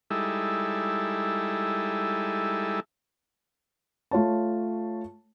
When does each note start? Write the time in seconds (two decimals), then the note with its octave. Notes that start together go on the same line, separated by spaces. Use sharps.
0.10 G3 G#3 D#4 E4 A4 E5
4.11 A3 F4 C#5 A5